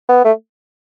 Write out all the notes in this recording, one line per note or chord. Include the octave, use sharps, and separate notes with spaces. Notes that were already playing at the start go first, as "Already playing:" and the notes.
B3
A3